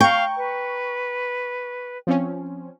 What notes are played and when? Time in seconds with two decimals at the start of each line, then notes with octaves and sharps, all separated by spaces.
0.01 F5 G5 A#5 C#6
0.37 B4
2.07 F3 C4 C#4